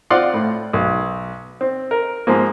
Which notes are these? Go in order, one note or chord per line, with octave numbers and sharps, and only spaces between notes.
C4 F4 D5 F5 F#5 C6
A2
B1
C4
A#4
G#2 F3 A#3